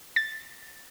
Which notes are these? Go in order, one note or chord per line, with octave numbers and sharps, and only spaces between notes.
A6